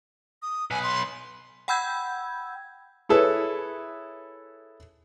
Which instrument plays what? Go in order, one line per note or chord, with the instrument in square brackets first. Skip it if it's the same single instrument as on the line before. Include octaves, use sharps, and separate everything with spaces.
[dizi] D#6
[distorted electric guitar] B1 B4 [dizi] G#5
[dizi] C6
[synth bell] F#5 G5 B5 E6 G6 G#6
[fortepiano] E4 G#4 A4 B4 C#5